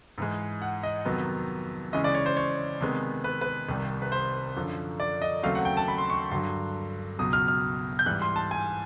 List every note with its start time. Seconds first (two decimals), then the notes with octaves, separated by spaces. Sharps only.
0.18 G#2 E3 G#3
0.62 F#5
0.83 D#5
1.05 F2 C3 D#3 F#3 B3
1.93 C#3 E3 G#3 C#4 E4 D#5
2.04 D5
2.15 C#5
2.26 C5
2.37 C#5
2.81 C3 D#3 G#3 B3
3.24 B4
3.41 B4
3.69 C2 C3 D#3 G3
4.02 B4
4.12 C5
4.56 F#2 D3 F3
5.00 D5
5.22 D#5
5.43 D#2 C#3 F#3 A3 C4 F5
5.55 F#5
5.65 G5
5.77 A5
5.88 B5
5.98 C6
6.10 C#6
6.31 G2 D3 F#3 C6
7.19 C#2 B2 F#3 D#6
7.33 F6
7.48 F6
7.99 G6
8.06 G#2 E3 G3 F#6
8.22 C6
8.36 A5
8.51 G#5